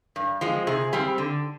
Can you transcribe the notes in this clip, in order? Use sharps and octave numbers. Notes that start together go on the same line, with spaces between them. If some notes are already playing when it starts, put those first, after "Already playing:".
G2
F3 G#3 C4
C3 G#4
G3 C4
D3